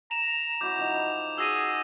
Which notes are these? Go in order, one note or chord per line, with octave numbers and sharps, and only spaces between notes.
A#5 E7 F7
F#3 E4 F#4 D6 G6
F3 D#4
F#4 G#4 E6 A#6 D#7